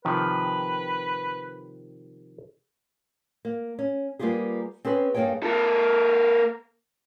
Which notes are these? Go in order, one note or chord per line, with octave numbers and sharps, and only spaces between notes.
C3 D#3 F3 B4
A#3
C#4
G3 A#3 B3 F4 G4 G#4
C4 C#4 G#4 B4
G2 G3 A#3 G#4 C#5 G5
A#3 A4